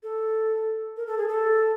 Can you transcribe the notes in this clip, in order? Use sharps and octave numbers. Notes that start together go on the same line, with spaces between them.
A4
A#4
A4
G#4
A4